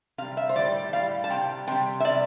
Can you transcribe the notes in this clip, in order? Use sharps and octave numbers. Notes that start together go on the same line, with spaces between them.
C3 G3 F5
E5
C5
A2 G3 D5
A2 G3 F5
A5
C3 G3 G5
C3 G3 G5
E5
C3 G3 D5